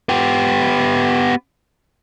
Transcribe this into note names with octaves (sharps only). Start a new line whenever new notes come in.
B3 G4